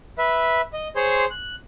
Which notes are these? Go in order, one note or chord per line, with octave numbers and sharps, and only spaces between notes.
B4 E5
D#5
G#4 C5 C#5 C6
F#6